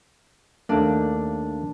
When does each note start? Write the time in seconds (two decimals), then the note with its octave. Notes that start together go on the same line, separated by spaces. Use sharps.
0.69 D#2 A3 A#3 D4